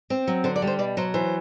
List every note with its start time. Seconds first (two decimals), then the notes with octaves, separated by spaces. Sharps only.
0.10 C4
0.27 F#3
0.44 D3 C5
0.56 D5
0.62 G3
0.67 C5
0.79 B2 D5
0.97 F#3 C5
1.14 E3 C5